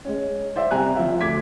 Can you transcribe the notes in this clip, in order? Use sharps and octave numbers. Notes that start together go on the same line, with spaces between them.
G#3 C#4
C5 D5 E5
C2 G4 G#5 A#5 F#6
F3 F4 E5
D2 D6 G#6 B6